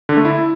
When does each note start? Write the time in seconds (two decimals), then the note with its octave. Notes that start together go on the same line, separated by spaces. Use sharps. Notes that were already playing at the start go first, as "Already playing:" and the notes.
0.09 D3
0.17 A3
0.25 E4